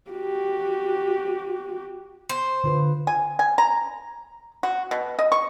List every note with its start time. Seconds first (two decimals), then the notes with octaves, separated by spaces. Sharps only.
0.10 F#4 G4
2.29 C5
2.64 D3 F4 B4
3.07 G#5
3.39 G#5
3.58 A#5
4.63 F#4
4.91 B2
5.19 D#5
5.32 C#6